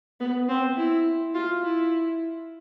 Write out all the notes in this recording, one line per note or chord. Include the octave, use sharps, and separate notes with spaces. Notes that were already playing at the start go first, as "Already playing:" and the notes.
B3
C4
E4
F4
E4